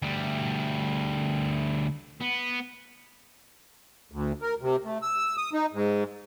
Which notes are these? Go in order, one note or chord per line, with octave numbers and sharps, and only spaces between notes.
D2 G3
B3
D2
A#4
C3
A3
E6
D#6
D#4
G#2